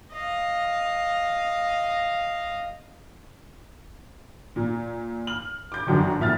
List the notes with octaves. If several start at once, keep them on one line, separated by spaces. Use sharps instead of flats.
D#5 F5
A#2
F6 F#7
D6 G6
G1 F#2 D3 D#3
F1 A#2 E5 F6 A6